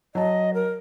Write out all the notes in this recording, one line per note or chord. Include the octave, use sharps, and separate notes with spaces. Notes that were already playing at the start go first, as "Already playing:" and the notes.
F#3 D#5 A5
A#4